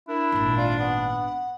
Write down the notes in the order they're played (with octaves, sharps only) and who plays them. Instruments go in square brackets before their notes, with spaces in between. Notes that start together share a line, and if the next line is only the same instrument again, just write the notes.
[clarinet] D4 [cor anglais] E4 [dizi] A#4
[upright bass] G#1 A#2
[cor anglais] F4 [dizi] D5
[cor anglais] B3 [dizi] F#5